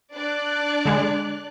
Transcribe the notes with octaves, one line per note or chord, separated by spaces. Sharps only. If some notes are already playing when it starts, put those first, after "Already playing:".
D4 D5 F#6
D3 G#3